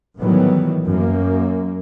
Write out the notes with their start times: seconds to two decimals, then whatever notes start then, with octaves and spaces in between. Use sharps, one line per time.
0.19 A2 D#3 E3 F#3 G3 B3
0.85 F#2 A#3